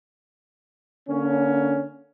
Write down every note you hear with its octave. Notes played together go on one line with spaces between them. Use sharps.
D3 A#3 C#4